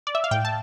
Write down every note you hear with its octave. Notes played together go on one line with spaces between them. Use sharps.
D5
E5
F5
A2 G5
A5